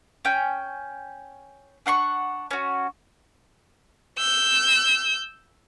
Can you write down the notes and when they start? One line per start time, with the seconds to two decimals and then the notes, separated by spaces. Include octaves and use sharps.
0.25 C#4 G5
1.86 D4 F#5 C6 C#6
2.51 C#4 F#4
4.18 E6 G6